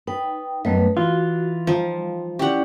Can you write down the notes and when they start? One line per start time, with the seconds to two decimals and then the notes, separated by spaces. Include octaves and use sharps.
0.07 D#4 B4 G5
0.65 F#2 G3 A3 B3 B4 D#5
0.97 E3 F4 F#4
1.67 F3 G3 D#4
2.39 C#4 E4 G4 D5 F#5